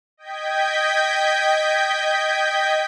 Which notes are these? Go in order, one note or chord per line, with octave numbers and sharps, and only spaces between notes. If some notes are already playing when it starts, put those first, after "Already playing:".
D#5 G5 G6 G#6 B6